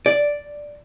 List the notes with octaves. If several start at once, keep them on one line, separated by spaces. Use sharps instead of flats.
D5